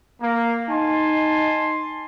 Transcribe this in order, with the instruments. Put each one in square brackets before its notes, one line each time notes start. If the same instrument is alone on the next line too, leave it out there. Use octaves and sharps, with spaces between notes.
[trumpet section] A#3
[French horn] D#4 [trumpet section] G#5 A5 C6